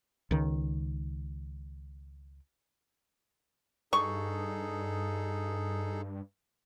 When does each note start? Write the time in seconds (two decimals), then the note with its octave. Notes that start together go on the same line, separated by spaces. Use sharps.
0.31 C#2 D#3
3.93 G2 D#4 G#4 A4 C#6